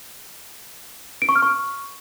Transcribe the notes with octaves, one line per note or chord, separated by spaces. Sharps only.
D7
C#6
F6
C#6